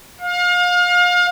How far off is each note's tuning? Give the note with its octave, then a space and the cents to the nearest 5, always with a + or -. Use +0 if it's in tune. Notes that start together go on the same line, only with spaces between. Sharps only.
F5 +30